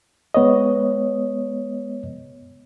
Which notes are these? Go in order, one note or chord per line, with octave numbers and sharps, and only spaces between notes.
G#3 B3 C#5 D#5